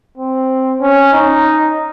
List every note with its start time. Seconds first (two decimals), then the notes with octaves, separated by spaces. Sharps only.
0.18 C4
0.81 C#4
1.13 D#4